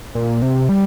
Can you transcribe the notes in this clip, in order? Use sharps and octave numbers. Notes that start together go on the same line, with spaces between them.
A#2
C3
G3